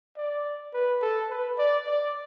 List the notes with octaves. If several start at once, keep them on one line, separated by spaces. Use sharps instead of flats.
D5
B4
A4
B4
D5
D5